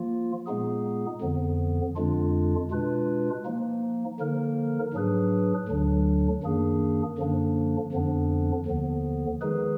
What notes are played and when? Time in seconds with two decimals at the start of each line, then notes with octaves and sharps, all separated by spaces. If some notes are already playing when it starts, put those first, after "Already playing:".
Already playing: F3 A#3 F4
0.46 A#2 G#3 B3 D#4 G#4
1.21 F2 D3 F3 B3
1.96 F2 D3 G#3 D4 F4
2.71 B2 G#3 D4 F4 B4
3.45 F3 A#3 D#4
4.20 D3 F3 A#3 D#4 A#4
4.93 G#2 F#3 D4 G#4 B4
5.69 D2 D3 F#3 D4
6.43 F#2 D#3 A#3 D4 G#4
7.18 F#2 D3 F3 A#3 D4
7.92 F2 D3 F3 B3 D4
8.66 D#2 D3 F3 B3
9.41 D#3 G#3 D#4 G#4 B4